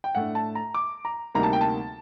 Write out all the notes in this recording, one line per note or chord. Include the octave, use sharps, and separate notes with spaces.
G5
A2 A3 D4 F#5
A5
A#5
D6
A#5
D2 C3 G3 A#3 D#4 A#5
A5
G5
A5